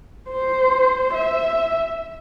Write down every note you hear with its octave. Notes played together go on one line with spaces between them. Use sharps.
C5
E5